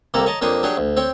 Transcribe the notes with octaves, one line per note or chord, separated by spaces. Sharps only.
C2 C3 A#3 A4 A#5
C#5 D#5 A5 A#5
F2 A#3 D4 C5 C#5 D#6
F#3 D4 G4 G#4 C#5
D2
C4 C#5 G5